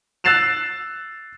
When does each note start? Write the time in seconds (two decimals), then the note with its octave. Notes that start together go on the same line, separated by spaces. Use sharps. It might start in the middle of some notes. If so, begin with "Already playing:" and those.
0.24 E6 F#6 A6 C7 E7 F7